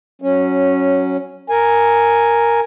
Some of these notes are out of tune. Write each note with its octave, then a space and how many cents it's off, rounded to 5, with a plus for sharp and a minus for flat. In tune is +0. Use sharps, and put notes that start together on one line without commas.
F#3 +0 C#4 -5
A#4 +0 G#5 +0